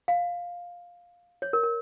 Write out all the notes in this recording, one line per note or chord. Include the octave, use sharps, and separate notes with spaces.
F5
C#5
A#4
A#4